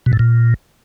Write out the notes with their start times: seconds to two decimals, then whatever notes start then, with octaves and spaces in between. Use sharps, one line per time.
0.06 B2
0.13 A2
0.19 A#2